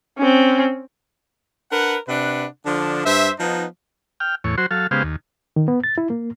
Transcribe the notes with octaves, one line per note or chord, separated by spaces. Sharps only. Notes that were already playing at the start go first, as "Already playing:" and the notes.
C4 C#4
D4 A#4 B4 F#5
C3 D4 B4 F#5
D3 F3 D4
G2 C5 E5
F3 B3 D#4
G5 F6
E2 A2 C#5
F#3 F#4 C5 C6
F#3 A4 F5
C#3 G#3 B3 G4 C5 F5
D#2
D#3
B3
A6
E4
A#3